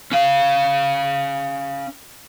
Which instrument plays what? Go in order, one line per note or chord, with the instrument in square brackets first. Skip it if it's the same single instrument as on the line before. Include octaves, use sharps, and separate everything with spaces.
[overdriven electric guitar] C#4 F5